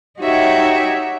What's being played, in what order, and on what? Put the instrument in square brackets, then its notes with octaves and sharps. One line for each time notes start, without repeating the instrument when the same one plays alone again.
[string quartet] D#4 F#4 G4 C#5 E5 G5